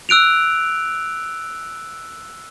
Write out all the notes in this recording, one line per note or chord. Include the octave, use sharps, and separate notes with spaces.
E6 F#6 D7 F7